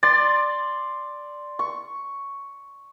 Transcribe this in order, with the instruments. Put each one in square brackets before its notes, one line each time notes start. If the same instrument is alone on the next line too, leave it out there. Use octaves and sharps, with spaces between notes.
[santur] D5 C6 [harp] A6
[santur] C#6